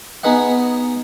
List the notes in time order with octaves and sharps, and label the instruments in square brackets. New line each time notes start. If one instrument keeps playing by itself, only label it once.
[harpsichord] B3 D#4 G#4 B4 D#5 F#5